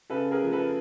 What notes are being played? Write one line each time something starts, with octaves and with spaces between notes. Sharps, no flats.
C#3 A4 B4
G#4 A#4
F3 A3
A4 B4